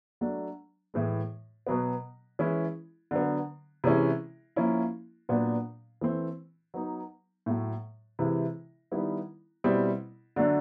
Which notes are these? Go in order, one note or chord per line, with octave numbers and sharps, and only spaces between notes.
F#3 A3 D4
A2 E3 G#3
B2 F#3 B3
E3 G#3 C#4 E4
D3 F#3 B3
C3 E3 G#3 C#4 E4
F3 A#3 C#4 E4
A#2 F#3 B3 D4
E3 A3 C4
F#3 B3 D#4
A2 F#3 A3
C3 E3 G#3 C4 E4
D#3 G3 B3 E4
B2 G3 C4 E4
D3 F#3 A3 D4